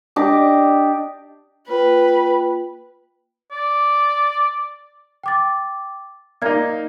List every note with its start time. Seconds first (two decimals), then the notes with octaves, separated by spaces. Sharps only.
0.16 D4 G4 D#5 D6
1.68 A#3 F4 B4 G5
3.52 D5
5.24 G5 D6 A6
6.42 A#3 D#4 D5 G#6